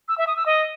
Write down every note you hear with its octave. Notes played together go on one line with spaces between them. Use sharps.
E6
E5
D#6
E6
D#5